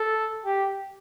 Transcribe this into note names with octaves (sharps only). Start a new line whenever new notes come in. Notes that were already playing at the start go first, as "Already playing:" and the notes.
Already playing: A4
G4